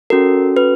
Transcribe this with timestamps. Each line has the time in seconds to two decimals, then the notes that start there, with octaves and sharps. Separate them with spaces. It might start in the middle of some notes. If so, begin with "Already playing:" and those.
0.10 C#4 F#4 A4 A#4
0.57 B4